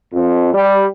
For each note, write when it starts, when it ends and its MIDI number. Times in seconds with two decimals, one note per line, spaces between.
0.14 0.51 41
0.54 0.86 55